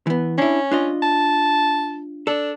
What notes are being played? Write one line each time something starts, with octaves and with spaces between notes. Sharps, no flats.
E3 B3
C#4 D4 E4
D4 F4 D#5
A5
D4 A4